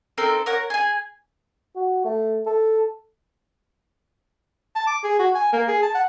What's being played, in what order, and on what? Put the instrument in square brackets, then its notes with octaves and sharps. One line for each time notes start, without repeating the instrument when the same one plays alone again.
[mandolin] C4 D#4 A4 A#4
A#4 C#5 F#5
G#4 G#5
[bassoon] F#4
A3
A4
[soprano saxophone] A5
D6
G#4
F#4
G#5
A#3
G#4
A5
F#5